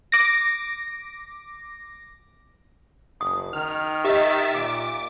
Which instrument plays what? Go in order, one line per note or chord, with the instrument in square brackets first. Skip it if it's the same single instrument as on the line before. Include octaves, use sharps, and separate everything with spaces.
[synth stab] D6 A#6
[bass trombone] F#1 [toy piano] D#6
[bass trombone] D#3 [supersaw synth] F6
[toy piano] G4 D#5 [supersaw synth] E5 A6 B6
[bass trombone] A#2 [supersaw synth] D6